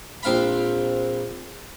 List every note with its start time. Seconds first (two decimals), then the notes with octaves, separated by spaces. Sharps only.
0.23 A#1 C4 F5 A#5 B5